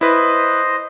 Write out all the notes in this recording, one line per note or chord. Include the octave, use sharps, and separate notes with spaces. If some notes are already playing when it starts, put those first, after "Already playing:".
E4 B4 C5 D#5